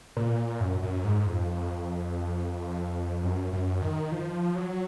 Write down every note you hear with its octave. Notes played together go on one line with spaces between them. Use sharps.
A#2
F#2
F#2
G#2
F2
F#2
F#2
D#3
F3
F#3